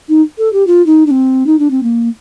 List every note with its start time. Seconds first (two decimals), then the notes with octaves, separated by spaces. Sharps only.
0.09 D#4
0.38 A4
0.53 G4
0.67 F4
0.86 D#4
1.06 D4
1.11 C4
1.46 D#4
1.59 D4
1.70 C4
1.83 A#3